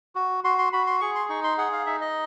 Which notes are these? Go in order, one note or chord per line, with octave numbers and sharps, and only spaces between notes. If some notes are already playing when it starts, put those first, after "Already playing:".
F#4
F#4 C6
C6
F#4 B5
C6
G#4 C#6
C6
D#4 C#6
C6
G#4 F#5
F5
D#4 E5
D#5